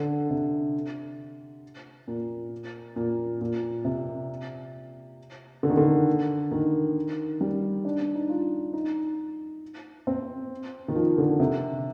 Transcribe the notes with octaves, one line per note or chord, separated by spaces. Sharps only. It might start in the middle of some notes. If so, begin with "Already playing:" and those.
Already playing: D3
C3
A#2
A#2
A#2
C3
D3
D#3
D3
D#3
G3
D4
D4
D#4
F4
D#4
C4
D#3
F3
D3
C3